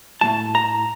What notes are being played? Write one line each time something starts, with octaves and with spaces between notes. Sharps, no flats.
A2 F#3 A3 A5
A#5